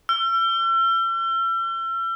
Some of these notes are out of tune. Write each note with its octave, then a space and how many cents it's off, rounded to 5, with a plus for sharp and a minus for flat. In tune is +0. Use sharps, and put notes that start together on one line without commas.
E6 +40